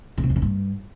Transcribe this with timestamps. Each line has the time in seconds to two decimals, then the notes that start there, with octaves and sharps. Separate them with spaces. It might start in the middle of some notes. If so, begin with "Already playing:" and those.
0.18 C#3
0.24 C3
0.30 F2
0.36 C#3
0.42 G2